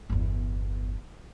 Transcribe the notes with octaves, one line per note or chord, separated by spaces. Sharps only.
G1 E2